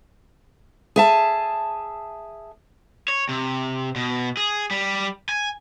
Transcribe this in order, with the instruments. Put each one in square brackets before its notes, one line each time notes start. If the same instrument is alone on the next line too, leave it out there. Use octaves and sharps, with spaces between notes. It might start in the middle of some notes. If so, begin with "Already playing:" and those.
[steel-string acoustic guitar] G#4 E5 A5
[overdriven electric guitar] C#5
C3
B2
G#4
G3
G#5